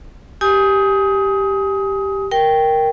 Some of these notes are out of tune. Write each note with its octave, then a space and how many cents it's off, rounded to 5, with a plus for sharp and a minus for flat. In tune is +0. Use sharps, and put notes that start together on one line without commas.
G4 +0 G#5 +0 D#6 +25
A#4 +0 G5 +0